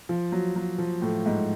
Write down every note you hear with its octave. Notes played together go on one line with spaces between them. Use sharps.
F3
F#3
F#3
F3
A2
G#2